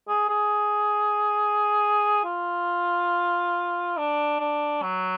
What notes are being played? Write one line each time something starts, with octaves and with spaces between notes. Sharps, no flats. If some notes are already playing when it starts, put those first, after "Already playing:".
G#4
G#4
F4
D4
D4
F#3